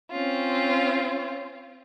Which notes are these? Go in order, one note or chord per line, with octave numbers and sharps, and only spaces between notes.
C4 C#4 F4